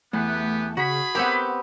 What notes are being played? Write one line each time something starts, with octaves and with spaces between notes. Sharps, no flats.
E2 E3 A3 B3 G4 B4
C#3 F#4 G#4 B5
B3 C4 G4 A#4 F#5 G6